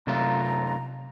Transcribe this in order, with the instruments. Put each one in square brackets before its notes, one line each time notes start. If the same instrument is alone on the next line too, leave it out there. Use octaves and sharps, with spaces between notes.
[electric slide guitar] F#2 A3 F4 [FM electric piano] C3 [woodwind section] A#5